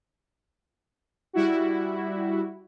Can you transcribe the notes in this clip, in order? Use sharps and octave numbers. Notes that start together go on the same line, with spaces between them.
G3 E4 F#4